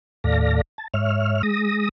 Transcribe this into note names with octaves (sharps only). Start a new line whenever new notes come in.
D#2 A2 A4 D5 F5 A#6
A5
G#2 C#5 E5 F6
G#3 D#6 A#6